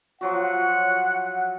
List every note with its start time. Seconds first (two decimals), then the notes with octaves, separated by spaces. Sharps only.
0.21 F3 F#3 F#4 F#5